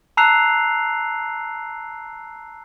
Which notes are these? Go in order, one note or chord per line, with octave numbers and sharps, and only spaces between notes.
A5 A#5 E6 F#6 C7 F7